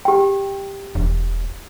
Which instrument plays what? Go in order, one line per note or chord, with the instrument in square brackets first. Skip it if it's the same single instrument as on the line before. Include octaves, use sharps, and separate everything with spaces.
[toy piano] G4 G5
[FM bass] E1